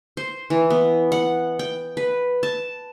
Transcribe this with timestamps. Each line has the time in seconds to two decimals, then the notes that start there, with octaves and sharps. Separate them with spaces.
0.17 C5
0.50 E3
0.70 B3
1.12 F#5
1.59 G5
1.97 B4
2.43 A5